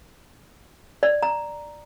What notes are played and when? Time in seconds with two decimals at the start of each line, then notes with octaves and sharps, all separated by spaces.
1.03 D5
1.23 A#5